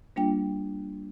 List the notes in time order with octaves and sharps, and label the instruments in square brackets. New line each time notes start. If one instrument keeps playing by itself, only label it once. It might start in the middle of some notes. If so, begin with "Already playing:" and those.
[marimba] G3 A#3 D4 F4 G5